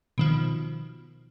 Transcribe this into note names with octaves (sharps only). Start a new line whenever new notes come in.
B2 D#3 F3